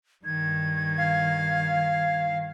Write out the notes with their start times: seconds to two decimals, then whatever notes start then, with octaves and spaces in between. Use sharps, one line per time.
0.25 G2 D#3 G#6
0.98 F5